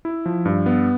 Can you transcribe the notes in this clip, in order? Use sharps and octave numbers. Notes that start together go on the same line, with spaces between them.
E4
F3
G2
B3